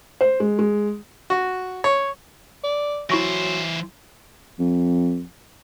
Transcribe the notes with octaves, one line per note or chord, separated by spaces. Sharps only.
C5
G#3
G#3
F#4
C#5
D5
E3 F#3 E4 C5 C#6 A#6
F2